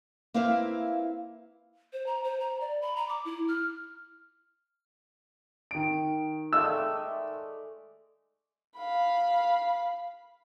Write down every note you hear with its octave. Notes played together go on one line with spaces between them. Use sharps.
A#3 C4 E4 B4 E5 F5
C5
A#5
C5
A#5
D5
B5
A#5
D6
E4
F6
D#3 D7
G#3 A3 D5 E6
F5 B5